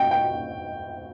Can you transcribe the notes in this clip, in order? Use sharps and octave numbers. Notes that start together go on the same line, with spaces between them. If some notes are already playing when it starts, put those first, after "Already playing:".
Already playing: G5
G5